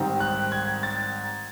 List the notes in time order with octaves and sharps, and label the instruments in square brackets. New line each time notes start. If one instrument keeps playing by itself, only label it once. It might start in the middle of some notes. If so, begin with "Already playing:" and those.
Already playing: [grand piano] G#2 D#3 G3 C4 D#4
F#6
G#6
A6